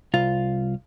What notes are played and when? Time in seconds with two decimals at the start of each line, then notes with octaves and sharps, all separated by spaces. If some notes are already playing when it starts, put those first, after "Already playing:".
0.14 C2 F4